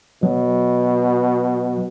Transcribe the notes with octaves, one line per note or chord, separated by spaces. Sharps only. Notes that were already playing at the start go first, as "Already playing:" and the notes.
B2 F#3